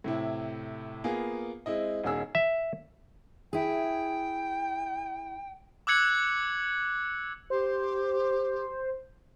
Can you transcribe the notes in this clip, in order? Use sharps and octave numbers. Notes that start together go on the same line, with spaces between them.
A2 C3 E4
A#3 B3 F4 G#4
G#3 C4 E4 D#5
E1 C#4 D#4 G#4 E6
E5
E4 G#4 G5
D6 E6 F#6 G#6 C#7 F#7
G4 C5